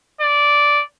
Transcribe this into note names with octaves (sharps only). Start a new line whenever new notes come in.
D5